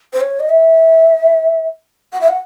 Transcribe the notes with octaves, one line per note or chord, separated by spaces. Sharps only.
C5
C#5
D#5
E5
F#5
E5
F#5